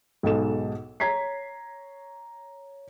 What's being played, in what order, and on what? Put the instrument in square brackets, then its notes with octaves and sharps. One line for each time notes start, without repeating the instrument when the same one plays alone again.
[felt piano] B1 G#2 A4 E7
C#5 A#5 G#6 B6 C7